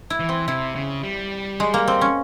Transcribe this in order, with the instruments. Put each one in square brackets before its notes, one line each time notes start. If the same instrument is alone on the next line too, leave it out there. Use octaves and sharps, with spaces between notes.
[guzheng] E4
[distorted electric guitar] E3
[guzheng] C4
[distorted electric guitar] C3 [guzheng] E4
[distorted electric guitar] C#3
G3
[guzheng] G#3
A#3
C4
C#4